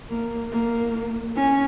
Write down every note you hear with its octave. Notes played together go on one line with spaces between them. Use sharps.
A#3
A#3
C#4